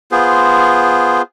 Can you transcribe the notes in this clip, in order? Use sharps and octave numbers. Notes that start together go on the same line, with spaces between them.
B3 F4 G#4 C5